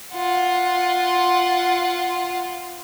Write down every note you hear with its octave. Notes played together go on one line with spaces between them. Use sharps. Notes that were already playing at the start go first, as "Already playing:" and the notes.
F4 F#5